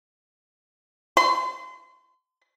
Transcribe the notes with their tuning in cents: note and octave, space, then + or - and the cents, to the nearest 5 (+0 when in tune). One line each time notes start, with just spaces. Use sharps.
C6 -35